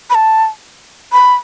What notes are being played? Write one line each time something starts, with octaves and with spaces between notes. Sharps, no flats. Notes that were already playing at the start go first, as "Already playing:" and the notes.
B5
A5
B5